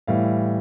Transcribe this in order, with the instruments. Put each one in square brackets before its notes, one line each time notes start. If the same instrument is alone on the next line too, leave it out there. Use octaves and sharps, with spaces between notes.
[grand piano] A2 E3 G3 F5